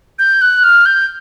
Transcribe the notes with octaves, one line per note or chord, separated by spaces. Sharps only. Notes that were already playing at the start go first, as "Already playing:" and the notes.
G6
F#6
F6
G6